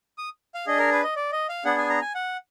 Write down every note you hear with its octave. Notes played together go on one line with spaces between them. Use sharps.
D#6
F5
D4 G#4 D#5
A#4
B4
D#5
D5
D#5
F5
B3 D4 G#4 F#5
G#5
A#5
G#5
F#5